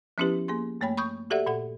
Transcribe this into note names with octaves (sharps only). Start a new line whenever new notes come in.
F3 B3 C#4 E4 G4 B4
A#3 G#4 C6
G2 A3 A#3 C#5 G5 B5
B5 C#6 D#6 G6
F#4 G4 A4 D5 E5 F#5
A#2 A4 F#5